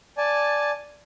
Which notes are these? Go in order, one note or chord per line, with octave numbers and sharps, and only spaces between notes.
D5 G#5 A5